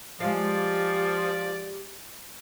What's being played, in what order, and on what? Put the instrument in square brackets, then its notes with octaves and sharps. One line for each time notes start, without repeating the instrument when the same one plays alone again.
[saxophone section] F3 [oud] G#3 F5 [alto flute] G4 [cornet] D5